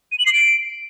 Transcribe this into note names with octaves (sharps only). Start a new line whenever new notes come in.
D#7
F#7
C7
D7